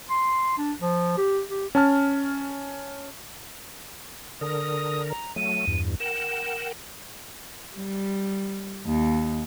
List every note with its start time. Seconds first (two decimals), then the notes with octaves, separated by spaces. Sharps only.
0.10 C6
0.58 D4
0.82 F3
1.17 G4
1.50 G4
1.75 C#4 A5 F6
4.41 D3 A#4 D#6
5.10 A#5
5.36 F#3 A3 D#7
5.67 E2 G2
6.00 A#4 F#5 G5 E7
7.76 G3
8.86 D#2